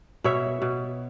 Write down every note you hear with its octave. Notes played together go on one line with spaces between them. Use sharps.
B2 C#5 E5
B2